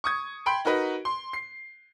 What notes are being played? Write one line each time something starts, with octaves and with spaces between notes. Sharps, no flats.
C#6 D#6 G#6
G5 B5 C6 D7
D#4 F#4 A#4 B4 D#5
C6
C7